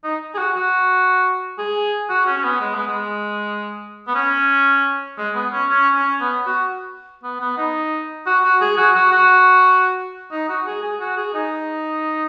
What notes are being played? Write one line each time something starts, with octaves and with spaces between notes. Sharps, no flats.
D#4
G#4
F#4
F#4
G#4
F#4
C#4
C#4
B3
G#3
B3
G#3
B3
C#4
G#3
B3
C#4
C#4
C#4
B3
F#4
B3
B3
D#4
F#4
F#4
G#4
F#4
F#4
F#4
D#4
F#4
G#4
G#4
F#4
G#4
D#4